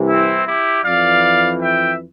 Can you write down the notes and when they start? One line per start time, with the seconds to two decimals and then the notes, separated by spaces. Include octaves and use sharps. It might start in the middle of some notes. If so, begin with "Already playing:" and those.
Already playing: C2 C3 E3
0.09 C4 E4
0.47 E4 G4
0.84 F2 E3 D5 F5
1.60 E5 G5